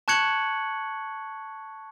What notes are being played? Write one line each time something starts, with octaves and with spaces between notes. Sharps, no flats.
A5 C#6 F#6 G#6 C#7 F#7